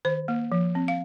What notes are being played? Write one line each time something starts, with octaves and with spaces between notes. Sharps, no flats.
D#3 C5
A#3
F3
C4
F5